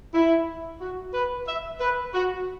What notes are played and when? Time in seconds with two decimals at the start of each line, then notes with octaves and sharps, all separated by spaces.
0.15 E4
0.81 F#4
1.14 B4
1.47 E5
1.80 B4
2.13 F#4